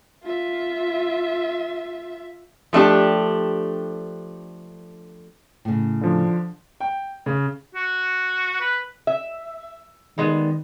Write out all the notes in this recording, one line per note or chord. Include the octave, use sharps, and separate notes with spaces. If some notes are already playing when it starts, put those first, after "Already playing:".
F4 E5
F3 A3 D4 G4
A2 C#3
D3 F3 D4
G5
C#3
F#4
B4
E5
D#3 G3 G#3 B3